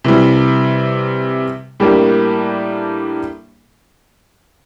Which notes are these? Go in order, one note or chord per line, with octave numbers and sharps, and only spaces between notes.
C3 E3 G3
A2 G3 A#3 D4 G4